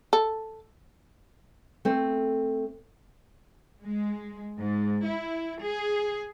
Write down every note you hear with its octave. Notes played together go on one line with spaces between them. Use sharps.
A4
A3 C4
G#3
G#2
E4
G#4